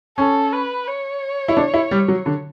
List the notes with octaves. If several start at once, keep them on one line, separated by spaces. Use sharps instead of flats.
C#4 A4
B4
C#5
E4
D4
E4
G3
F#3
D3